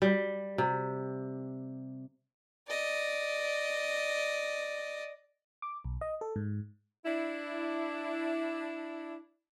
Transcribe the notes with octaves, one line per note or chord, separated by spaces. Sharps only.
G3
C3
D5 D#5
D6
B1
D#5
A4
G#2
D4 E4